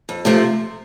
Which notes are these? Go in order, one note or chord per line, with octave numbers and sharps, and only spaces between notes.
F2
C3 F3 A3